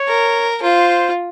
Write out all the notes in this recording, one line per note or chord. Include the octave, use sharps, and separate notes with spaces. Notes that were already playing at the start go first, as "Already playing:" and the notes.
Already playing: C#5
A#4
F4 C5